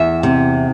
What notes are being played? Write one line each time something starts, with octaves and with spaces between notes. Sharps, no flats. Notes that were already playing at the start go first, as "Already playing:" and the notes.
Already playing: E2 E5
C3